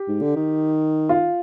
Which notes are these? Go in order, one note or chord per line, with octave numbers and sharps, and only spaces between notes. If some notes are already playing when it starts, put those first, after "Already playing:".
Already playing: G4
G#2
D3
D#3
F4